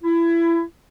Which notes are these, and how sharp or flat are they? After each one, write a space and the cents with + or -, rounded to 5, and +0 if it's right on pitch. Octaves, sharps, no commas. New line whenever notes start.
E4 +25